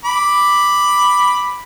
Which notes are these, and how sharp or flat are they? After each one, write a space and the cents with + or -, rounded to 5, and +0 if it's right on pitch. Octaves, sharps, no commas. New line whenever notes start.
B5 +0 D6 +0